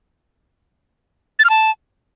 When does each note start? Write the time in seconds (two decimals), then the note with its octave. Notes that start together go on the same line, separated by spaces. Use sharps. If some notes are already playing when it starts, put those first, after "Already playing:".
1.39 A6
1.44 F6
1.50 A5